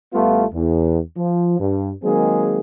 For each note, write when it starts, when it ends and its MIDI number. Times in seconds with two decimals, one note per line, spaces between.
0.14 0.44 33
0.14 0.44 55
0.14 0.44 57
0.14 0.44 59
0.14 0.44 65
0.53 0.99 40
1.17 1.56 53
1.59 1.92 43
2.03 2.60 51
2.03 2.60 54
2.03 2.60 56
2.03 2.60 58
2.03 2.60 60
2.03 2.60 68